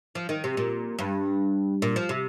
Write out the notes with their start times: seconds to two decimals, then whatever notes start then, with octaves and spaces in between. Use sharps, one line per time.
0.15 F3
0.29 D#3
0.44 C3
0.57 A#2
0.99 G2
1.82 A#2
1.96 F3
2.09 C3